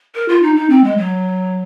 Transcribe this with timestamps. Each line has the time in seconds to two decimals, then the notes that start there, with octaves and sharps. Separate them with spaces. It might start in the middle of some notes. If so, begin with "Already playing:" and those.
0.15 A#4
0.29 F4
0.42 D#4
0.56 D#4
0.70 C4
0.84 G#3
0.97 F#3